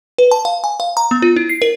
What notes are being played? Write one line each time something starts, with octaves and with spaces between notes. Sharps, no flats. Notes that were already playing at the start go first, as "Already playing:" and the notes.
B4
A5
F5
G#5
F5
A#5
B3
F4
E4
C7
A#4